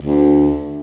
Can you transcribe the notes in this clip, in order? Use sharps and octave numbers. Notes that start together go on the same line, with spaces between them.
D2